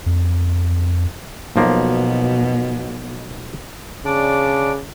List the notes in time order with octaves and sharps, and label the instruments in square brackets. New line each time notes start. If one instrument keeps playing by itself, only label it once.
[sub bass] F2
[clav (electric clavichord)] B1 F3 A#3 [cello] B2
[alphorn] C#3 [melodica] D4 D5